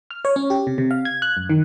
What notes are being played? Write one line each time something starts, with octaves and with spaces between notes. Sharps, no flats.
F6
C#5
C#4
G4
C3
C3
F5
G#6
F#6
F#2
D#3